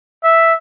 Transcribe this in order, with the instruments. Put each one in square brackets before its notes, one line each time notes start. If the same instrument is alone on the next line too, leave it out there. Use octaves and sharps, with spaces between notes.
[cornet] E5